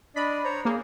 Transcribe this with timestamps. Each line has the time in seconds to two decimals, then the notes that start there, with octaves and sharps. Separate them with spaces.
0.16 D4 D5 D#5 B5
0.44 C5 C#5 A#5
0.65 A#3 G#4